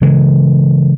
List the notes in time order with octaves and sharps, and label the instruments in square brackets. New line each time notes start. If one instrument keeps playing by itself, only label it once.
[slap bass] C#3 E3 G#3